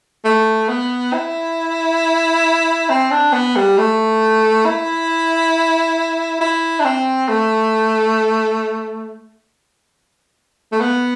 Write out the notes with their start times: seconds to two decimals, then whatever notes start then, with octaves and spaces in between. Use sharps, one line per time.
0.25 A3
0.69 B3
1.13 E4
2.89 C4
3.11 D4
3.33 B3
3.56 G3
3.78 A3
4.66 E4
6.41 E4
6.80 D4
6.85 C4
7.29 A3
10.72 A3
10.81 B3